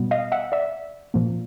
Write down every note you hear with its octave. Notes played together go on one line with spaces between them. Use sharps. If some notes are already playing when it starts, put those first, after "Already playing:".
Already playing: B2 G3 B3
D#5 F5
E5 F#5
D5 E5
A#2 F3 A#3